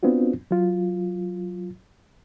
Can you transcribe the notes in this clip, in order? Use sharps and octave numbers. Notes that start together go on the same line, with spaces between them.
B3 C4 D4 F4 F#4
F#3 F4